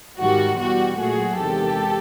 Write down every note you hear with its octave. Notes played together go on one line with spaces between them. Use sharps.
G#2 D#3 G3 F#4
E2 B2 G3 F#4
A#2 F#3 A3 F#4 G#4
E2 C3 D#3 G#3 G4 A4